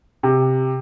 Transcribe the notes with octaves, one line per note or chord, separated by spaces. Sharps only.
C3